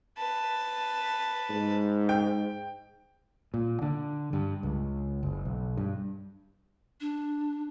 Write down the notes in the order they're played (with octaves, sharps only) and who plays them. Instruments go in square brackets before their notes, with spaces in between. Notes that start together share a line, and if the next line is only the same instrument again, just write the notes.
[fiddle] B4 A5
[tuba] G#2
[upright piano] G5
[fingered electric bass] A#2
D3
G2
C#2
F#1
B1
G2
[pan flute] D4